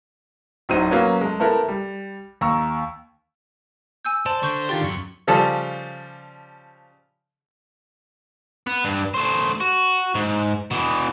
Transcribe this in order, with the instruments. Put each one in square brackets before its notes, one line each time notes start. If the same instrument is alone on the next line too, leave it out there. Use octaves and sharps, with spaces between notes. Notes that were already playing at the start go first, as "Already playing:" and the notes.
[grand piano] D1 A2 F#3 D#4 C5 D#7
F#3 A#3 B3 C#4
G#3 A3
A3 B3 E4 A4 A#4
G3
D#2 A#5 C#6 E6
[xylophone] G#5 E6 G6
[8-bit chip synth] C5 [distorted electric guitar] D5 [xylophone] A5
[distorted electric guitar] D3 [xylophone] C#6 G6
[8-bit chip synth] D#3 F4 G4 [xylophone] C6 A6
[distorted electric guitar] F#2 [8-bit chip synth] C#6
[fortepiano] C#3 F3 G3 A4 D5 A5
[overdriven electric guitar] B3
G2
A3 C5
F#4
G#2
B2 E3